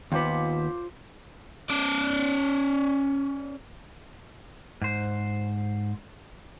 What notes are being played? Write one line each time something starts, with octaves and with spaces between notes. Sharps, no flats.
D#2 B3 F4 C5 D6
C#4 D5
G#2 C5